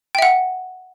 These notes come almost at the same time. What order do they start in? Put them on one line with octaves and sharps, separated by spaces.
G5 E5 F#5